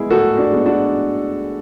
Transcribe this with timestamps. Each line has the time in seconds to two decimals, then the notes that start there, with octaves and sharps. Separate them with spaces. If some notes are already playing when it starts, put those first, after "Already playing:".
Already playing: A2 G#3 B3 E4 G#4
0.10 A2 F#4 A4
0.37 D4 F#4
0.52 G#3 B3
0.66 D4 F#4